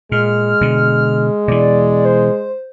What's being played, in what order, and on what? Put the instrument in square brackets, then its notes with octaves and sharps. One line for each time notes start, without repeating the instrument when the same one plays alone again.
[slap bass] A#2 [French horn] G#3 [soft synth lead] F6
[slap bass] B2 D3
[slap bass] B2 E3 [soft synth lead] D5
[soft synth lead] C5